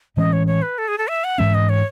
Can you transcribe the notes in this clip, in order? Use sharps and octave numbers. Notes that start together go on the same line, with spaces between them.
A2 E3 G#3 C#4 D#5
C#5
C#5
B4
A4
G#4
A4
E5
F#5
G#2 E3 G#3 C#4 E5
D#5
C#5